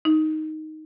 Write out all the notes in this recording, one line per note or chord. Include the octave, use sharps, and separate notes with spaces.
D#4